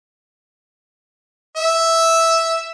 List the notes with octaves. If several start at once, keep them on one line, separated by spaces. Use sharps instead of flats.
E5